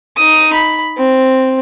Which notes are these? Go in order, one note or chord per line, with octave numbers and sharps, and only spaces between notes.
D#4 D#6
B5
C4